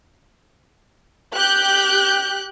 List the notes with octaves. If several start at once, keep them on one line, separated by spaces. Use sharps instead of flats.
G4 F#6 G6